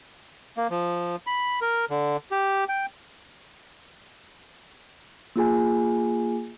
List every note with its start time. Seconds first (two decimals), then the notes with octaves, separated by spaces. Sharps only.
0.57 A#3
0.70 F3
1.27 B5
1.62 A#4
1.90 D3
2.31 G4
2.69 G5
5.36 A#3 F4 G#4 G#5